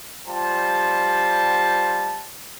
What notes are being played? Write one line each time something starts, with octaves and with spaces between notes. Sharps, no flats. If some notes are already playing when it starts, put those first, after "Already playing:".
G3 F4 C5 G5 A5